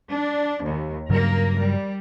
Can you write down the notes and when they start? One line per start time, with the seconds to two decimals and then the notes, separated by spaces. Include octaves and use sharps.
0.11 D4
0.65 D#2
1.10 G2 C#3 F#3 A#3 A#4
1.59 G3